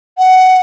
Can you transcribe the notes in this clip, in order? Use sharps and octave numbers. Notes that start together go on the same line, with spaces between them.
F#5